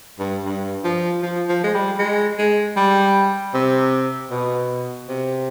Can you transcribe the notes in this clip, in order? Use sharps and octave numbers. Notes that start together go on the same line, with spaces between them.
G2
G2
F3
F3
F3
G#3
G3
G#3
G#3
G3
C3
B2
C3